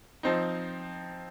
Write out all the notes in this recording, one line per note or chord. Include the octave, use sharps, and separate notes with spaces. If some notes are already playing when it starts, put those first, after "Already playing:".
F3 C4 D#4